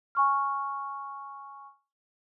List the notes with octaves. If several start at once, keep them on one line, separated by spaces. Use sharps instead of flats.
G#5 C#6 F6